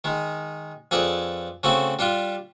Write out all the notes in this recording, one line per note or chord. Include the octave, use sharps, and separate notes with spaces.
D#3 G#3
F2 G#4 A4 B4 D5
C#3 A3 C4 E4 F#4
G3 D4 F4